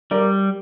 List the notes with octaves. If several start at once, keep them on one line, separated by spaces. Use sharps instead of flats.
G3 A#4 D5